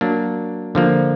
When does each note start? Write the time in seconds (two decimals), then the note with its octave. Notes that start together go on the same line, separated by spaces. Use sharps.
0.01 F#3 A#3 D4
0.75 D3 F3 A#3